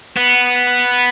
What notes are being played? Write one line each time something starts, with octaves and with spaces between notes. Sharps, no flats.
B3